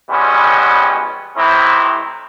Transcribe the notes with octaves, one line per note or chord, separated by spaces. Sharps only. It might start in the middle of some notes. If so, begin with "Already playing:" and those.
B2 E3 G3 G#3 C4 C#4
A2 C3 E3 C4 D#4 E4